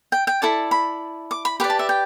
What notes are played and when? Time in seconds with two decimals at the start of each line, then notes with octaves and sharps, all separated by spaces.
0.12 G5
0.27 G5
0.42 E4 A4 D5 A5
0.71 B5
1.31 D6
1.45 B5
1.60 G4 B4 D5 B5
1.70 A5
1.79 E5
1.89 G5